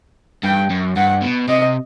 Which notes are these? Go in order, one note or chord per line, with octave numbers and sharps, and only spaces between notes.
G2 G5
F#2
G2 F#5
B2
C3 D#5